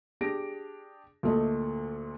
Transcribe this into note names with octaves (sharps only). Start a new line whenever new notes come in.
D4 G4 G#4 A#6 D7
D2 A#2 A3 D#5